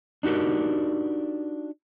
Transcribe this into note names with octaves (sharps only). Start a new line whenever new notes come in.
D4 D#4 F#4 G4 A#4